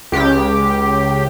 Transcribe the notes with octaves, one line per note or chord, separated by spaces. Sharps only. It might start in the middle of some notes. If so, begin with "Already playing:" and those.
C#2 G4